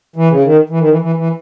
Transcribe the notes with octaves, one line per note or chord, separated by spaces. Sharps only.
E3
C#3
D#3
E3
D#3
E3
E3
E3